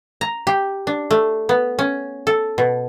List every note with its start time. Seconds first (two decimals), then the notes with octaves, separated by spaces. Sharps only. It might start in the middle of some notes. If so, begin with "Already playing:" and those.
0.21 A#5
0.47 G4
0.87 D4
1.11 A3
1.49 B3
1.79 C#4
2.27 A4
2.58 B2